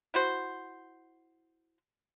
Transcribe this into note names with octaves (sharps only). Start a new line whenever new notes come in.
E4 F#4 C5